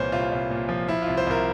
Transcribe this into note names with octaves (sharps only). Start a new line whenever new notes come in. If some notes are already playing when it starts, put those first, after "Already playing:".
Already playing: C2 A#2 E3 C5 C#5
C2 F4
C2
A#2
F3
F3 E4
C2 F4
C5
C2 A#4